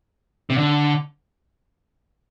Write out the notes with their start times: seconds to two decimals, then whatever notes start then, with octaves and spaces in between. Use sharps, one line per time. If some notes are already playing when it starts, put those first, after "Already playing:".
0.50 C3
0.58 D3